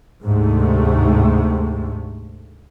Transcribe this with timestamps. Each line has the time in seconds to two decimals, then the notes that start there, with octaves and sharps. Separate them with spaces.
0.24 D2 G#2 C3 A3